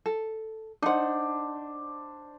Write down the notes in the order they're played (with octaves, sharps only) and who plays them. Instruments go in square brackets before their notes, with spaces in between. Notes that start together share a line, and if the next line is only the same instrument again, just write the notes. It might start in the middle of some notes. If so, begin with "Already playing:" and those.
[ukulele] A4
[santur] D4 C5 [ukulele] D#4 F#5